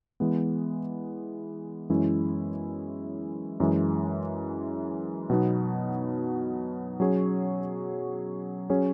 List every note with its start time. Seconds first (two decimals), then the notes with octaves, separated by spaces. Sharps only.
0.20 E3 G#3 B3
1.90 F#2 E3 G#3 C#4 E4
3.60 F#2 E3 G#3
5.30 B2 F#3 B3 D#4
7.00 F#3 C#4 G#4 C#5
8.70 F#3 C#4 G#4 C#5